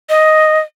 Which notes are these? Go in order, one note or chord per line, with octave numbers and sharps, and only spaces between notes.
D#5